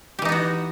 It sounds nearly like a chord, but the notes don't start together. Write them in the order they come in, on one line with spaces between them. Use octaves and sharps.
G4 E3 D#4 B3 F#4